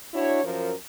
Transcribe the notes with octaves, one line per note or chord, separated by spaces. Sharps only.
D4 E4 F#4 C#5
F#2 F3 A#4